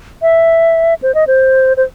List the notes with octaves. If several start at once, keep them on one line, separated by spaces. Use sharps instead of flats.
E5
C5
D#5
C5
C5